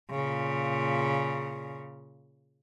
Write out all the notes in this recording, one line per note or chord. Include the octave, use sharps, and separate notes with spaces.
A#2 C#3